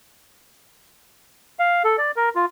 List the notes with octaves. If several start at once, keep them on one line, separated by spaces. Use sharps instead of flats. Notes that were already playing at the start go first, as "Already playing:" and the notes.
F5
A4
D5
A#4
F4